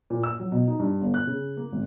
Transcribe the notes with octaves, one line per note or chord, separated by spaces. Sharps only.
A#2
E6
F#3
B2
D#4
G2
G1
F#6
C#3
A#3
G#1